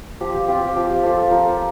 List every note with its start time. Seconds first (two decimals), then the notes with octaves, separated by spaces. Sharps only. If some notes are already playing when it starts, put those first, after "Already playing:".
0.21 F3 G4
0.34 G4
0.48 C4 F4 G4
0.62 G4
0.76 F3 G4
0.90 G4
1.03 C4 F4 A4
1.17 A4
1.31 F3 A#4